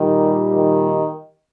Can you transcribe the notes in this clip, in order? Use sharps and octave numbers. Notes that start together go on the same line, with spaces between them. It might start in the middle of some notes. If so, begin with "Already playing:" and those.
Already playing: A#2 D#3 G3 A#3 D#4 G4
D#3